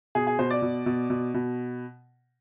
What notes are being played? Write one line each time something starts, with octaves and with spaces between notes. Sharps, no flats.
B2 G#4
G#4
B2 C5
D5
B2
B2
B2
B2